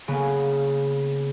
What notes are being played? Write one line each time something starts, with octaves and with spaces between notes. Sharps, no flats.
C#3 A#3 B3